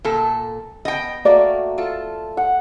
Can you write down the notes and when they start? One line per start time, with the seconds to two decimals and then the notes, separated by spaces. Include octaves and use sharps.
0.05 A#2 A4
0.85 B3 D#5 G5
1.25 A3 A#3 F#4 D5
1.78 F4 A4
2.37 F#5